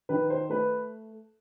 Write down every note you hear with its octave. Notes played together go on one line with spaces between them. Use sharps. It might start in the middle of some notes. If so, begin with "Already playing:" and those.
D#3 B4
C5
A3 B4